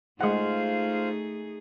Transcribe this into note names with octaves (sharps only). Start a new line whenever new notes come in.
G#3 A3 D#4 F4 G#4 C5 F5 F#5